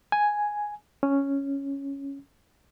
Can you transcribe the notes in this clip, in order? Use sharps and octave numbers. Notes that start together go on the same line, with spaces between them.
G#5
C#4